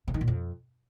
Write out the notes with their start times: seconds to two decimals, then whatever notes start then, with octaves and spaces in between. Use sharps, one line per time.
0.08 C3
0.14 D#3
0.21 A#2
0.28 F2